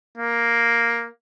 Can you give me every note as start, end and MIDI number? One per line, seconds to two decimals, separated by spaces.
0.17 1.08 58